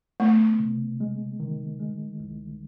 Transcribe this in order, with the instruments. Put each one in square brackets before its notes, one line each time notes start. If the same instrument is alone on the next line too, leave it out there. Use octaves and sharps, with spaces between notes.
[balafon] A3 [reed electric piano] B3
[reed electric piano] C3
G#3
D#3
G#3
C2